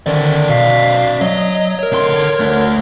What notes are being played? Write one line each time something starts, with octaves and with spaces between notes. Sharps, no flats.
D3 D#3 C#4 D5
B2 F5 B6
F#3 D#5
A#4 C#5
D3 C6
A3 D4